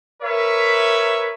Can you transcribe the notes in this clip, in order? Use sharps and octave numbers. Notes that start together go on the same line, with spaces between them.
A#4 B4 C#5 E5